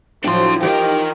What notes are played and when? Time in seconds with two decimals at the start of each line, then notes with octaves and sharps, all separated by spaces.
0.24 A2 F3 F#3 D4 C6
0.63 E3 D#4 F4 G4 A#4 D#5 G5